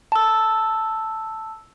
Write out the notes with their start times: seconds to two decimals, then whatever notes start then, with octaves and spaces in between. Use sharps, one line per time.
0.12 A5 E6